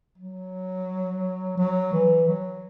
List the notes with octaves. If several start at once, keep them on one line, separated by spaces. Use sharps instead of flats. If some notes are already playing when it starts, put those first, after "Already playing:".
F#3
F#3
E3
F#3